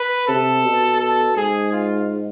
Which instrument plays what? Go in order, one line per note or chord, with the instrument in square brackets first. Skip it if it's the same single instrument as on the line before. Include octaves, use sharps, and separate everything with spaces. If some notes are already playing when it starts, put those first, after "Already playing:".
Already playing: [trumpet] B4
[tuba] C3 [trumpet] A4
[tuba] B2
[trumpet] A4
[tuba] G#2 [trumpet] G#4
[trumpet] F4